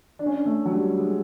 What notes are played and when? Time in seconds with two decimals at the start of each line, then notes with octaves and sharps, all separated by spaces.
0.19 D4
0.26 C#4
0.33 D4
0.46 A3
0.66 F#3
0.73 G3
0.99 G#3